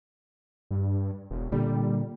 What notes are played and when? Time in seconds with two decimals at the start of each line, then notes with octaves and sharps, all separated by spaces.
0.71 G2
1.31 E1
1.52 A#2 D3 G3